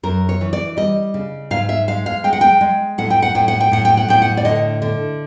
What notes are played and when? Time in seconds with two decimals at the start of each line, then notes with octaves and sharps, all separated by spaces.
0.03 F#2 A#4
0.29 C#5
0.41 E3
0.53 D5
0.77 G3 D#5
1.14 C#3
1.51 G#2 F5
1.69 E5
1.88 G#3 F5
2.06 F5
2.24 G#3 G5
2.33 F#5
2.41 G5
2.61 G#3
2.98 A2 F#5
3.10 G5
3.22 F#5
3.35 A2 G5
3.48 F#5
3.61 G5
3.72 A2 F#5
3.85 G5
3.97 F#5
4.08 A2 G5
4.22 F#5
4.37 D5
4.45 D3 D#5
4.82 D3